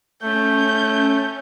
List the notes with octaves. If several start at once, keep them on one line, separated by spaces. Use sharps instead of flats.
A3 C#4 G6